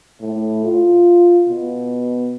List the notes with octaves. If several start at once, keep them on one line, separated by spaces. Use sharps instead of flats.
A2
F4
B2